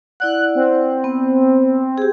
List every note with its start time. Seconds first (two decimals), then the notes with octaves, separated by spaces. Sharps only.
0.20 E4 D5 F#5 F#6
0.55 C4
1.04 B3
1.98 G4 G#4